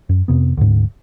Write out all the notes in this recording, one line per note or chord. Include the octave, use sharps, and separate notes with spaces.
F#2
F2 C3 B3
D2 G#2